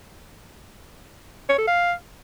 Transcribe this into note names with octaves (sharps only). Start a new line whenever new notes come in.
C#5
A4
F5